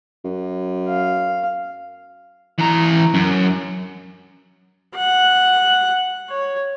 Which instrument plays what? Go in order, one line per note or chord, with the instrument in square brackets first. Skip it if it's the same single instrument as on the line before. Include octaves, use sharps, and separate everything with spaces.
[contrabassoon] F#2
[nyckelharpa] F5
[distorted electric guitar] E3 A#5
F#2
[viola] F#5
C#5